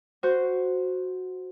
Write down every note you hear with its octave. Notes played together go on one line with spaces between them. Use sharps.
F#4 C5